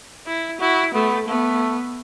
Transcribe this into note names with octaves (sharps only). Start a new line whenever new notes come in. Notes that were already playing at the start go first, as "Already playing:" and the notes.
E4
E4 F#4
A3 B3
A3 B3